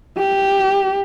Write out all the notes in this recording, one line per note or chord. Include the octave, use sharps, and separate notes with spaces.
G4